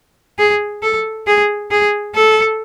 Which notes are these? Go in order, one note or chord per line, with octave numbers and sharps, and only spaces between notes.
G#4
A4
G#4
G#4
A4